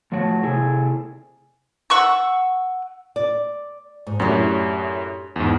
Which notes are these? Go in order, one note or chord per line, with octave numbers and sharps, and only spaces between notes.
A2 F3 A3 F#4 C#5 A5
C3 E4 G#4 A4
F#5 C#6 E6
D5
G#2
F#2 A2 C#4 D4 G4
E2 G#2